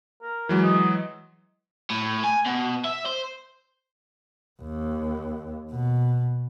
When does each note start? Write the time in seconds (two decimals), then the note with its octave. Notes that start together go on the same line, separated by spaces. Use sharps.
0.22 A#4
0.49 E3 F#3 G#3 A#4
0.63 D#5
1.90 A2
2.24 G#5
2.46 B2
2.85 E5
3.06 C5
4.62 D#2
5.71 B2